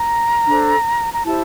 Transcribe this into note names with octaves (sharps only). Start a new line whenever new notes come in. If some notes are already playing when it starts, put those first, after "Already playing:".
Already playing: A#5
D4 A4 C5
A#5
E4 G4 C5 A5